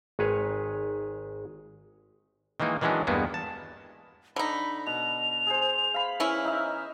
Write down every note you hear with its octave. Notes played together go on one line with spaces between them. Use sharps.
G#1 D#3 G#3 G#4 B4 C#5
D#3 E3 G#3 A#3 D#4
D#3 E3 F#3 G#3 C#4 D4
E2 G2 G#3 A#3 B3
A5
D3 D#4 B5
B2 F7
G#4 C5
F5 B5
E3 C#4 E4 F6
D#4 D#5 E5